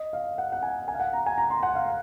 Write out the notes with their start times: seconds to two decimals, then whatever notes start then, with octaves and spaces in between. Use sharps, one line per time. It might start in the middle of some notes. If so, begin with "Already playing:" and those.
Already playing: D#5
0.13 F5
0.38 F#5
0.52 F#5
0.63 G#5
0.88 G#5
0.94 F5
1.00 F#5
1.13 A#5
1.26 G#5
1.38 A#5
1.50 C6
1.63 F#5
1.75 F5